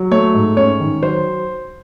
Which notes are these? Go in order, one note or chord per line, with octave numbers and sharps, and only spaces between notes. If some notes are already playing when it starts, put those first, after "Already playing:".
Already playing: F#3
A3 C#5
G#2
C#4 C#5
D#3
F#3 C5